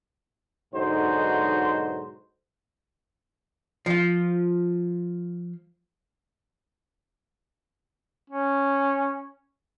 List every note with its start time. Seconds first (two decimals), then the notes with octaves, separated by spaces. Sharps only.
0.74 B1 G#2 D3 D#4 F#4 C5
3.86 F3 F4
8.30 C#4